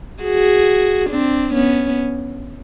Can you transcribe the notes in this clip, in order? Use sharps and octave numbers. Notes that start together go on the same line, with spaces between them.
F#4 G#4
C4 D4
B3 C#4